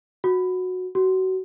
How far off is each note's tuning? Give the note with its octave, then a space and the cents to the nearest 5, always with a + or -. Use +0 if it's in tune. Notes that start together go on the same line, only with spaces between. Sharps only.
F#4 -10
F#4 +25